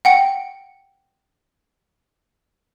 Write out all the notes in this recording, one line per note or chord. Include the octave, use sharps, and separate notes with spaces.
F#5 G5 C#7